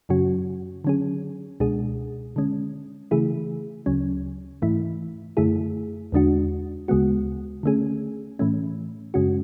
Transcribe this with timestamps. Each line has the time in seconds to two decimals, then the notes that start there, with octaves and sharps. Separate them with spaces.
0.09 F#2 C#3 F#3 C#4 F#4
0.84 D3 F#3 C#4 G#4
1.60 C#2 B2 G#3 D4 G#4
2.36 D3 G#3 C#4
3.11 C#3 E3 A3 E4 G#4
3.86 D2 C#3 F#3 C#4
4.62 G#2 E3 A3 E4
5.37 F#2 D3 A3 E4 G#4
6.12 E2 D3 G#3 D4 F#4
6.88 D2 C#3 G#3 B3 F#4
7.63 D3 A3 C#4 G#4
8.39 A2 E3 A3 C#4
9.14 F#2 C#3 G#3 C#4 F#4